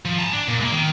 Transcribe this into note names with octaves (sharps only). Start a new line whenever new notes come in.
F3
A5 A#5
D4
A#2
G#3 A#3
D#3